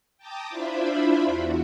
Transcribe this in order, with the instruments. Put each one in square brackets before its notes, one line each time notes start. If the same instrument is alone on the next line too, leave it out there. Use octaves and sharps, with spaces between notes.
[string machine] G5 A5 A#5 D6 D#6
D4 E4 F4 C5 E5 B5
E2 F#4